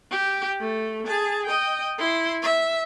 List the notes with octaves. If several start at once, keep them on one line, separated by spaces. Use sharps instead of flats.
G4
A3
G#4 A5
D#5 G5
E4 C6
E5